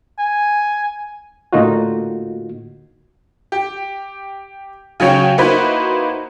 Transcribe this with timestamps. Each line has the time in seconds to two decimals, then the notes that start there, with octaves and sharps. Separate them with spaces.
0.19 G#5
1.53 A2 D3 A#3 D#4 F4 F#4
3.52 G4
5.00 C#3 F#3 F#4 C#5 G5
5.38 A#3 D#4 E4 F#4 B4 C5